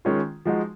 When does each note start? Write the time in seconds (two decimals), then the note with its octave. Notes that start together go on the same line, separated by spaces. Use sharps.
0.05 D#3 G#3 C#4 F4
0.45 F3 G#3 D#4 F#4